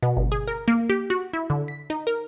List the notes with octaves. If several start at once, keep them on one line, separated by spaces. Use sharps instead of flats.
B2
G1
G#4
A#4
A#3
G4
F#4
E4
D3
B6
D#4
A#4